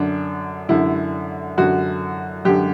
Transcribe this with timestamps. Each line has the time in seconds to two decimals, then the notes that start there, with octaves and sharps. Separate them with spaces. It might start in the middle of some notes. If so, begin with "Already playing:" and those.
Already playing: F#2 D3 D4
0.69 F#2 D3 E4
1.57 F#2 D3 F#4
2.45 F#2 D3 G4